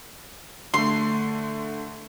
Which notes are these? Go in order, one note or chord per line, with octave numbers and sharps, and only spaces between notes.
D3 A3 C6